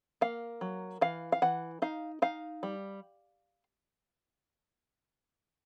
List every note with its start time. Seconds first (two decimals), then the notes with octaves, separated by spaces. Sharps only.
0.21 A#3 F5
0.61 F#3
1.01 E3 F5
1.32 F5
1.42 E3 F#5
1.82 D#4 F5
2.22 D#4 F5
2.63 G3